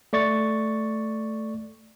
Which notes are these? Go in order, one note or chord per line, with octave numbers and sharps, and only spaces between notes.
A3 D5 C#6 A6